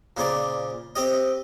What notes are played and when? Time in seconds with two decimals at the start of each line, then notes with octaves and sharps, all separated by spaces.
0.17 A#2 C#3 C5 D5
0.95 C4 G4 D#5